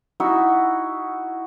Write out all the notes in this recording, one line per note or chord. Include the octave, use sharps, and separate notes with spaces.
D#4 E4 F#4